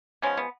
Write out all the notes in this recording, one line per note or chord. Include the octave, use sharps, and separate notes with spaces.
F3 G#3 B3 C#4
B3